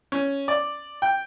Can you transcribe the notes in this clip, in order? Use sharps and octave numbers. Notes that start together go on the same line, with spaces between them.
C#4
D5
G5